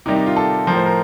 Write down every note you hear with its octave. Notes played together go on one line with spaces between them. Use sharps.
C3 D#3 G3 D#4
D#4
F4
A4
A2 F3 A#4 C5
A#4